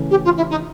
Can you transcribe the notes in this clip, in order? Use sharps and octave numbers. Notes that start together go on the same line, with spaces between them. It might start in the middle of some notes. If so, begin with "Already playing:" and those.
Already playing: C#3 E3 A3 C#4
G4
F4
E4
D#4